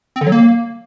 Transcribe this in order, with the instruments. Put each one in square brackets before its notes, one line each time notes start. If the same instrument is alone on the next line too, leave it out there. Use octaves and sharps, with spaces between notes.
[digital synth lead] C4
D3
F#3
A#3